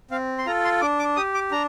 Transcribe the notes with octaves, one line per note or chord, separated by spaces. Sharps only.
C4 F5
C6
F4 A4 A#5
C6
D4 D6
D6
G4 D#6
D6
D4 A#5